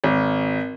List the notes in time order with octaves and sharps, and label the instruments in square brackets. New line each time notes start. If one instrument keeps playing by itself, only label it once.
[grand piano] G#1